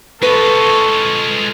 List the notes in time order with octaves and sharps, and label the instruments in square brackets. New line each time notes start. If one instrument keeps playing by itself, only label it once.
[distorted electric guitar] G#3 F4 [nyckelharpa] A4 C#6 [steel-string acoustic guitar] B4